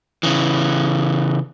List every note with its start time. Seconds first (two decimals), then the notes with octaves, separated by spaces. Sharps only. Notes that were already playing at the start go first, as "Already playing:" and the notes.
0.23 C#3 E3